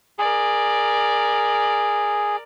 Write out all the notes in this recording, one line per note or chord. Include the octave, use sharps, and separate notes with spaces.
G#4 A#4 D5